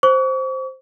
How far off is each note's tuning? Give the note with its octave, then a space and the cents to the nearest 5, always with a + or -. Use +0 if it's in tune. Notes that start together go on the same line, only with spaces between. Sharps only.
C5 +0 C#6 +45